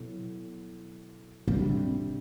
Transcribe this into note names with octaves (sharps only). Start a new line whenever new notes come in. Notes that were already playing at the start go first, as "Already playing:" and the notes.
Already playing: B2 F#3 B3 E4 A4
C3 G3 C4 D4